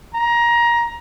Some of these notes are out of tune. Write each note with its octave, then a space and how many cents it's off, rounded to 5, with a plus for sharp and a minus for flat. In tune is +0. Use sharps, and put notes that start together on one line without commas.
A#5 +20